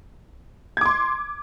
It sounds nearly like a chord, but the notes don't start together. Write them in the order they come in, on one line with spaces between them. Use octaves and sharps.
G#6 D6 C6